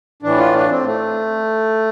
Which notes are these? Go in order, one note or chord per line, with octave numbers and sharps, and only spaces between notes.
A2 E3 D4
F4
D4
C4
A3